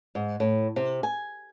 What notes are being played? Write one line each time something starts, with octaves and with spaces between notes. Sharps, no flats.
G#2
A2
C3
G#5